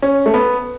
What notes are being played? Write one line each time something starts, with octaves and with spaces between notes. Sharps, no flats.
C#4
A3
B3